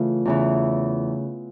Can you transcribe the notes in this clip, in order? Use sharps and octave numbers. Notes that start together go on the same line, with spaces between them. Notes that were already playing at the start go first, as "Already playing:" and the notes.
Already playing: C#3 E3 A3 C#4 F4
E2 C#3 E3